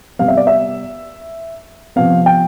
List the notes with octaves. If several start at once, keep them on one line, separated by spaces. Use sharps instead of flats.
C3 G3 B3 F5
E5
D5
E5
C3 F3 B3 F5
G5